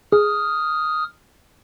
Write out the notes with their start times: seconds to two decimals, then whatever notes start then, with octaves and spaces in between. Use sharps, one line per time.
0.12 G#4 D#6 F6